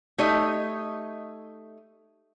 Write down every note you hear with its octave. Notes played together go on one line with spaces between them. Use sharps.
A3 D#4 G4 C#5 D#5